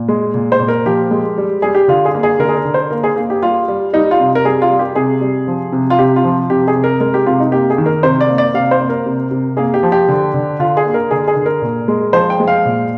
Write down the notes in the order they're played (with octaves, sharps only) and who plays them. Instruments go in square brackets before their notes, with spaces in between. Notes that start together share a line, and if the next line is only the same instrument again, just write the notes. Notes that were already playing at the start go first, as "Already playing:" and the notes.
Already playing: [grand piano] A#2
G#3
A#2
C5
A#2
A#4
F3 G4
G#3
G3
G3 G#4
G4
D3 F4
G#4
A#3
G#4
D3 A#4
G#4
A#4
D3
C5
A#3 A#4
G#4
A#3
G4
G3 F4
G3
G3 D#4
F4
C3
A#4
G3 G#4
F4
G3
G4
C3 G#4
G3
F3
C3
F4
C3 G4
F4
F3
C3 G4
G#4
C3
A#4
G#3 A#4
G4
C3 F4
D#4
A#3 G4
G#4
D#3
A#4
C3 C5
D5
A#3
D5
C3 F5
C5
A#3
A#4
C3
C3
A#3 G#4
G4
F3
G4
D3
D3
D3 F4
G#4
A#3
A#4
D3 G#4
G#4
D3
A#4
A#2
G#3
F3 C5
G5
G#3
F5
A#2